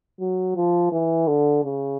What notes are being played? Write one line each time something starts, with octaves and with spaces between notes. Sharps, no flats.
F#3
F3
E3
D3
C#3